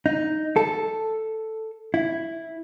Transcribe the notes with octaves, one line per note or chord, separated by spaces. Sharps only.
D#4
A4
E4